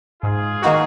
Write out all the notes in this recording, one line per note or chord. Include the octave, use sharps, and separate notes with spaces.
G#2 F4 G#4
D#3 A#3 D#4 F#4